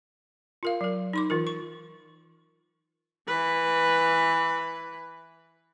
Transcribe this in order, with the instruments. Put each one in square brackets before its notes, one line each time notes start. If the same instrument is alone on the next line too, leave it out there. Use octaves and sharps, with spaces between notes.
[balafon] F4 A#4 F5
F#3 A#4
D#4 C6 D6
E3 F4 A#4
C#6
[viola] E3 B4